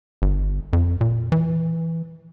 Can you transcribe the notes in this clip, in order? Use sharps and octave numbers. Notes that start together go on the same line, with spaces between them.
G1
F2
A#2
E3